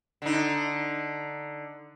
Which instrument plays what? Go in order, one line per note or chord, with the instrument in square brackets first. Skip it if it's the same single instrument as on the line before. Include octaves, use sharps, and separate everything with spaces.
[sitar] D3 D#4